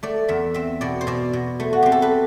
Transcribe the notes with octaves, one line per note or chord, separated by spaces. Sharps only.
A3 D5
E2 E5
C4 E5
B2 D5
C5
B2 D5
B2
A3
F#4
C4 G4
A4
B4